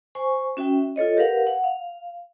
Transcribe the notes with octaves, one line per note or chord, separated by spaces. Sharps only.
C5 G#5 C#6
C#4 F#4 E5 G5
F4 A4 C#5 D#5
G4 A#4 B4 F5 F#5
F#5
F5